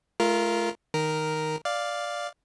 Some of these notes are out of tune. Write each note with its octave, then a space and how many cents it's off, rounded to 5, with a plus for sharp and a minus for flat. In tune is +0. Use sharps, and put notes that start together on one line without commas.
A3 -30 F4 -20 A#4 +5
D#3 +0 A#4 +0
D5 +0 F5 +0